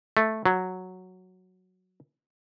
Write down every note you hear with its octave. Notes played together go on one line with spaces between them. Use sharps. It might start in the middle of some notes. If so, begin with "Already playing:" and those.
A3
F#3